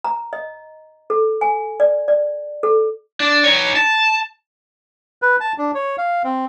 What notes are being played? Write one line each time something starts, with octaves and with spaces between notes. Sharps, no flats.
A#5
D#5
A4
G#5
D5
D5
A4
D4
D#4 C#5
A5
B4
A5
D4
C#5
F5
C4